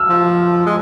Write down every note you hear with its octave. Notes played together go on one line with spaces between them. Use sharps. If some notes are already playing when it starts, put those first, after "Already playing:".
Already playing: E6 F6
F3
G#3